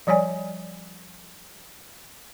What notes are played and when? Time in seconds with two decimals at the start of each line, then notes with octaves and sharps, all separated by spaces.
0.07 F3 G3 C#5 D5 G#5